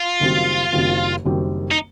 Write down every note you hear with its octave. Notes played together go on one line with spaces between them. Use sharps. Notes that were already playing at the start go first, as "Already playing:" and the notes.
Already playing: F4
F#1 F#2 D#3 G3 C4
F#1 F#2 D#3 G3 C4
F#1 F#2 D#3 G3 C4
D#4